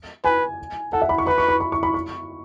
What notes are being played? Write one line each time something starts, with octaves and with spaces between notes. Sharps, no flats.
B4 G#5
A4 F#5
E5
B5
C#6
B4 B5
C#6
B5
B5
C#6
B5
C#6